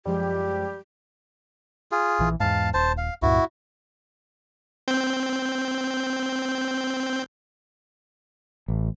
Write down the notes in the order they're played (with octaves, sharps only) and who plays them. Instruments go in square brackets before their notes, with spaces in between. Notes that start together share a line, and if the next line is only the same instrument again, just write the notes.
[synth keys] F#2 F3 G#3 [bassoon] G3 [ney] G4
[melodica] F4 G#4
[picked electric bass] A#1 E3
[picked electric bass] E2 G#2 [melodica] F5 A5
[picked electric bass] D#1 [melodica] C5 A5
[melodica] F5
[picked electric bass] C#2 G2 A#2 [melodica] E4 F#4
[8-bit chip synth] C4 G6
[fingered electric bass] A1